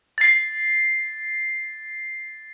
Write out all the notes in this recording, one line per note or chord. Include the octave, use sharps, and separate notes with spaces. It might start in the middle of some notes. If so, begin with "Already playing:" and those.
A6 C7